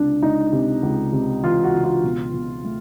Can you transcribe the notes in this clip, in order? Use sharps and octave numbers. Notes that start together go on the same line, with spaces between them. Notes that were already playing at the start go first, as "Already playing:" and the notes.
Already playing: C#2 C3 D4
C#2 D#4
C3
C#2
C3
E3 F4
F#4
C#2
F4
B2
B2
A3